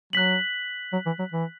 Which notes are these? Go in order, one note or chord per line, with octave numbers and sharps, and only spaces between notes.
F#3 F#6 B6 F#7
F#3
E3
F#3
E3